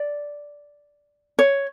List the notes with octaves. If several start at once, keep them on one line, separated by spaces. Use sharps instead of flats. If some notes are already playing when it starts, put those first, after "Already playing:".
Already playing: D5
C#5